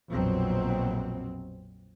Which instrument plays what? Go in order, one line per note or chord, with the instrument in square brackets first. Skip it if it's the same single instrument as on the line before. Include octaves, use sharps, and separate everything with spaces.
[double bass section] A#1 F2 B2 F#3 C4